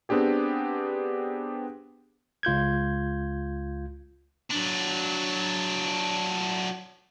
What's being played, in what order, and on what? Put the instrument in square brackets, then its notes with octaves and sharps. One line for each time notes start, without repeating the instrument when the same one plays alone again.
[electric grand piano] B3 C4 D4 G4 G#4
[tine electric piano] C#2 F4 G6 G#6
[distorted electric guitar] F#3 D4